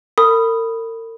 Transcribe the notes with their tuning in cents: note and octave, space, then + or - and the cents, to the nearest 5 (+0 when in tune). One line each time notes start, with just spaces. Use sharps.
A#4 -45 B5 +0 D#6 +0